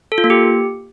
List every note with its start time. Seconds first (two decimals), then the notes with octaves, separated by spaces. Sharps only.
0.12 A4
0.18 F4
0.24 A#3
0.30 G4